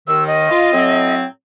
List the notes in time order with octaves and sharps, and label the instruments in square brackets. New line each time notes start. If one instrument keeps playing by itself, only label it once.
[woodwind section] D#2 D#3 [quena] E6
[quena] D#5
[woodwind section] F4
A2 F#3 C4